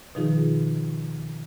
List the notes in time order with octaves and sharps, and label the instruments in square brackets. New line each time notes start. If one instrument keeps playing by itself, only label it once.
[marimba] B2 D#3 F3 D#4 F4 G#4